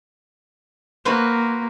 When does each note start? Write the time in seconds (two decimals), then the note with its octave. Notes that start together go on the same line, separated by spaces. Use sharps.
1.05 A#3 F#4 B4 C5